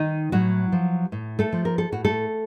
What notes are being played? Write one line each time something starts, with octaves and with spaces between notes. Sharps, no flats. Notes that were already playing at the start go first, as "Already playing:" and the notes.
Already playing: D#3 D#4
A2 F#3 F#4
F3
A2
A3 A4
F3
A#4
A4
A2 F#4
A3 A4